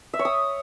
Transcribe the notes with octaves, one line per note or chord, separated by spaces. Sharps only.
E5
C#5
D#6